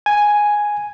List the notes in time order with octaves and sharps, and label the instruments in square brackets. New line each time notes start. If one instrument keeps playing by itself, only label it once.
[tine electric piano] G#5